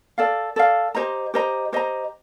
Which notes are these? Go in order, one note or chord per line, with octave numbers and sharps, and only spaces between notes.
A4 D5 F5
A4 D5 F5
G4 C5 D#5 A#5
G4 C5 D#5 A#5
G4 C5 D#5 A#5